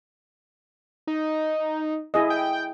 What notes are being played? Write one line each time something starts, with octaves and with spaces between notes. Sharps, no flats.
D#4
E4 G#4 D#5
G5